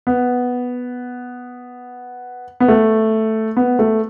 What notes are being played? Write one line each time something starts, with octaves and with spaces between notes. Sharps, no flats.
B3
B3
A3
B3
A3